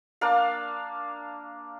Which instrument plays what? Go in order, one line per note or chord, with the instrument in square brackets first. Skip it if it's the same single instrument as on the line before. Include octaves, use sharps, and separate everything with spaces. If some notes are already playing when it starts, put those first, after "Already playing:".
[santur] A#3 D4 D5 F5